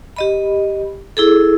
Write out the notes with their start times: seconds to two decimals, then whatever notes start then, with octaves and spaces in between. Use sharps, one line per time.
0.16 G4 D#5 B5
1.17 E4 G#4 A4